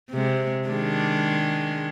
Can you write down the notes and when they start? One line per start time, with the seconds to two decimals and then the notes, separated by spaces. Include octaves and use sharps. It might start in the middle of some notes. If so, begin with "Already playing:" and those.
0.10 C3 G#3
0.68 D#3 G#3 D4